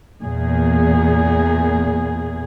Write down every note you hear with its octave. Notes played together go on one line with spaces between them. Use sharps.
E2 A#2 G#4